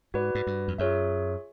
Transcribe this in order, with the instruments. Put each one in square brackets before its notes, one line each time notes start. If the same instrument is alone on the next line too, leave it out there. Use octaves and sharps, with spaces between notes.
[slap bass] G#2 [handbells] F#4 B4 D5
[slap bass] G#2
G2
F2
[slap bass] F#2 [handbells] F4 G#4 C#5 E5